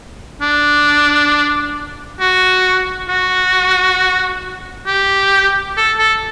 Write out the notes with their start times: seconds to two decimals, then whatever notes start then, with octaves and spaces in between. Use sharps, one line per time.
0.41 D4
2.20 F#4
3.09 F#4
4.87 G4
5.77 A4
5.98 A4